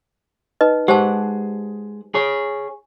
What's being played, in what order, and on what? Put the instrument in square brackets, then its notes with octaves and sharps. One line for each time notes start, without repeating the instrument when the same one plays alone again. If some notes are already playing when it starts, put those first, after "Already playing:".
[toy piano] D#4 B4 D#5
[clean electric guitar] G#3 F#5 [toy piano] G4 C5 A5
[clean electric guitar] G#4 C#5